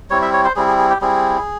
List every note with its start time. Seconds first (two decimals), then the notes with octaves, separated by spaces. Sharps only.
0.10 G3 C4 E4 C#5
0.22 E5
0.33 C#5
0.44 C5
0.56 G3 C4 E4 G#4
0.68 G#4
0.78 G#4
0.90 G4
1.01 G3 C4 E4 G#4